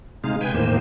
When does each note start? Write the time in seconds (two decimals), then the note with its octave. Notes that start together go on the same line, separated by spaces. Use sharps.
0.24 C3 G#3 D#4 F5
0.41 B4 G5 G#5
0.54 E2 A2 D#3 A#3 C5